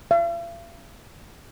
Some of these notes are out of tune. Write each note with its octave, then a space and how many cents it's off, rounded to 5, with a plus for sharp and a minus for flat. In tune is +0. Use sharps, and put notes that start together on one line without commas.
F5 -45